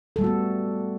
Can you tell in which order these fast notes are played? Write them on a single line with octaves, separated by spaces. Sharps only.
A4 G3 A3 F#4 B3